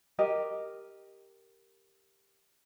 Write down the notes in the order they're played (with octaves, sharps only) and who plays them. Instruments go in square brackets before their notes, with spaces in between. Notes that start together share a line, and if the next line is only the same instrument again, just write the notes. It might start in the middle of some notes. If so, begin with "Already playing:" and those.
[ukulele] G4 A#4 D#5